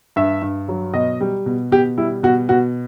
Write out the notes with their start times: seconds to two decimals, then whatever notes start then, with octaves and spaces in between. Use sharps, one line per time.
0.16 G2 E5
0.42 G2
0.68 F#3
0.94 B2 D#5
1.21 G3
1.46 B2
1.72 B2 G4
1.98 G3 E4
2.23 B2 F#4
2.49 B2 F#4